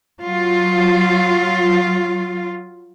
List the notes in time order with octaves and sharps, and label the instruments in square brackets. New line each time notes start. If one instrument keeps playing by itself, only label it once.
[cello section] F#3 F4